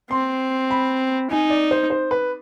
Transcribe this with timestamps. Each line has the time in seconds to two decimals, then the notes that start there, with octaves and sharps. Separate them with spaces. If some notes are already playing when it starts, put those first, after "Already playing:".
0.11 C4 C6
0.71 B5
1.30 D#4 G#5
1.50 D5
1.71 C5
1.90 C5
2.11 B4